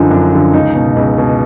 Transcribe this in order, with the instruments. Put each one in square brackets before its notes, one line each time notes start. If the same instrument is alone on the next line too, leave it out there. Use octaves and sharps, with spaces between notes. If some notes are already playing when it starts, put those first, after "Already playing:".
Already playing: [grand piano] F#2 D3 F3 D#4
F#2 D4
D3 F3
C#2 D#4
B2
C#2
B2